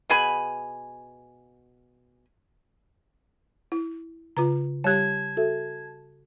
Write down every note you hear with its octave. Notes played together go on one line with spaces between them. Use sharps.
B2 G#4 G#5 B5
E4
C#3 F4 B4 A#5
G3 G4 C#5 A5 F#6 G#6
F#4 A4 E5